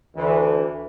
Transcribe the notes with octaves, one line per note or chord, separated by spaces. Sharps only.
D2 E3